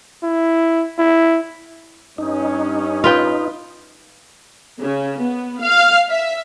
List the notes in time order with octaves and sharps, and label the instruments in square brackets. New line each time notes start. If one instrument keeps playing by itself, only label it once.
[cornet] E4
E4
[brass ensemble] G2 C#4 [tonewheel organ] D#4
[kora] F4 B4 G5
[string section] C#3
B3
F5
E5